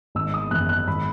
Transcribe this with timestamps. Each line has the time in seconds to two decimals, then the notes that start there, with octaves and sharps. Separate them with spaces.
0.15 G#1 E6
0.34 D#6
0.51 F#2 E3 F#6
0.69 F#6
0.88 G#1 B5